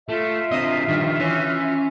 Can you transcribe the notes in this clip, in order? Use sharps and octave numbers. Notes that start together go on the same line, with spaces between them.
A3 F4 E5
D3 C4 D#5
G2 D#3 F3
E3 C#4